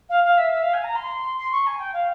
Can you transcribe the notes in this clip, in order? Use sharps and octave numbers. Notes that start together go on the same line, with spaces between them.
F5
F5
E5
E5
F5
G#5
A#5
C6
C6
C#6
G#5
G5
F5